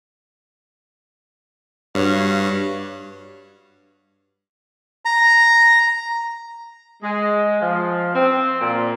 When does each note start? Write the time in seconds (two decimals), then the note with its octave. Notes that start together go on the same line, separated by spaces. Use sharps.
1.95 G2 F#4 C#5 F5
5.05 A#5
7.03 G#3
7.61 F3
8.15 C4
8.61 A#2